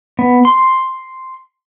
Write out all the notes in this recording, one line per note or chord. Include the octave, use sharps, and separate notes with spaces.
B3
C6